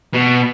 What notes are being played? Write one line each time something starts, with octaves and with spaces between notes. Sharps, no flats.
B2